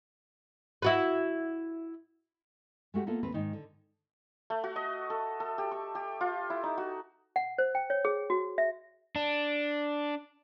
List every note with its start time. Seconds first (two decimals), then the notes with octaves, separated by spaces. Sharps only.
0.82 E4 F#4 B4
2.94 G#3 A3 F#4 G4
3.07 A#3 B3 F4 A4
3.23 D#2 C4 B4
3.34 G#2 D#3 D#4
3.53 D3
4.50 A3
4.64 F#4
4.76 D#5
5.10 A4
5.40 A4
5.58 G4
5.72 C#6
5.95 G4
6.21 F4
6.50 E4
6.64 D#4
6.78 F#4
7.36 F#5
7.58 C5
7.75 G5
7.90 C#5
8.05 G#4
8.30 F#4
8.58 E5
9.16 D4